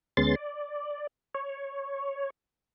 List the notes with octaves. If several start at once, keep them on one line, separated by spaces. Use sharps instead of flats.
D2 G#3 B3 C#4 C6 A6
D5
C#5